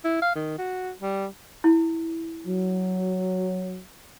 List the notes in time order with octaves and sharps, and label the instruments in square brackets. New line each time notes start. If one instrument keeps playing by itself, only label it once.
[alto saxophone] E4
F5
D#3
F#4
G3
[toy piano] E4
[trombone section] F#3